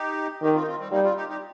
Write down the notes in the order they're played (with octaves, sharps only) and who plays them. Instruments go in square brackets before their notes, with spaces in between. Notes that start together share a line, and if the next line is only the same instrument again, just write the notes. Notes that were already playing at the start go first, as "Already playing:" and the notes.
Already playing: [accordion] D#4 G4
[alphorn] D#3 [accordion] D#4 G4
[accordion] C4 F4
D#4
C4 F4
G3 C4
[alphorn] G3 [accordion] A#3 D#4
[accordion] C4 F4
D#4 G4
D#4 G4